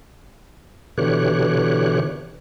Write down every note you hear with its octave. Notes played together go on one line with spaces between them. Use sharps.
B2 D3 E3 G4 C#5 F#6